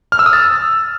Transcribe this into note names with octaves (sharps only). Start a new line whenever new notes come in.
F6
E6
D#6
A6